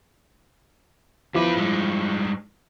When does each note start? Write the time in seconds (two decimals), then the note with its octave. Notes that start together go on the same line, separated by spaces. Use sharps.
1.34 E2 F3 E4 B4 D6
1.57 G2 G#3